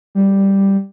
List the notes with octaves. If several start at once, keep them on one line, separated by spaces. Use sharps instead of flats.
G3